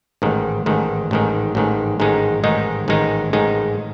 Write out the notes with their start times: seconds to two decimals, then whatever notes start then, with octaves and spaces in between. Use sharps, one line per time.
0.22 A1 G#2 D#3
0.66 A1 G#2 D#3
1.11 A1 G#2 D#3
1.55 A1 G#2 D#3
2.00 A1 G#2 D#3 G#3 D#4
2.44 A1 G#2 D#3 G#3 D#4
2.88 A1 G#2 D#3 G#3 D#4
3.33 A1 G#2 D#3 G#3 D#4